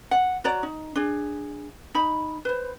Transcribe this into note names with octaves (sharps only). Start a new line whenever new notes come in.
F#5
F#4 C#5 D5 A#5
D#4
D4 G#4
D#4 B5
B4 C5